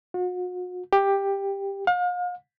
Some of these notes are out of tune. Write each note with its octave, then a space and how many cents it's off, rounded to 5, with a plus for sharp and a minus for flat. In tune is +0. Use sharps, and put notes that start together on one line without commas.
F#4 -40
G4 +10
F5 +40